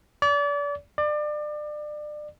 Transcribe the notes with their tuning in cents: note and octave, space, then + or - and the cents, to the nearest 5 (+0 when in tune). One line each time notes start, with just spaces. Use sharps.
D5 -35
D5 +30